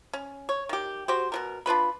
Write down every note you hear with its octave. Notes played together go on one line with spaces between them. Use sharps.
C#4
C#5
D#3 G4
F#4 G4 C5
B2 F#3 A#4
D4 F4 B4 B5